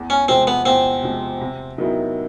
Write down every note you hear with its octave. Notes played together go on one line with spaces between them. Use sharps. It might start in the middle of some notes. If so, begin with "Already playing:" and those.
Already playing: E2
C#4
C3 F3 G#3 C4
B3
E2 C4
C3 F3 G#3
C3
D#3 F#3 B3 E4